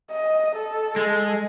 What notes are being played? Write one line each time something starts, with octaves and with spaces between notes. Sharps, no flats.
D#5
A4
G#3